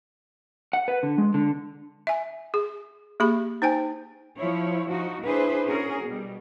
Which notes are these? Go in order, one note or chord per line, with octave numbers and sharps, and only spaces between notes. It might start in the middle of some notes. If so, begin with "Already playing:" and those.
F#5
B4
D3
G#3
D3
E5 G#5
G#4
A#3 G4 G#4 B5
D#4 C5 G5 G#5
F3 E4 C#5
F3 D#4 F#4
D4 E4 G#4 B4 C5
C#4 F#4 G#4 A#4
B2 G3